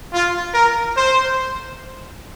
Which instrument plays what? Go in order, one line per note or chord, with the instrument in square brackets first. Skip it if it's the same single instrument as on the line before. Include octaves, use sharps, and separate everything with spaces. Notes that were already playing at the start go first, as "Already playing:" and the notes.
[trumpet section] F4
A#4
C5